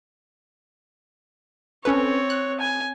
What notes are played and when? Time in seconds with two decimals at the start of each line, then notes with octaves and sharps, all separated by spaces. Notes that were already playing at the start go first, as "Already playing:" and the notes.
1.85 C4 C#4 A4 B4 C#5
2.30 F#6
2.60 G#5